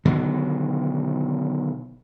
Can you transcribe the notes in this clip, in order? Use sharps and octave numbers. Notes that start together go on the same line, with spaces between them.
B2 D3 D#3 F#3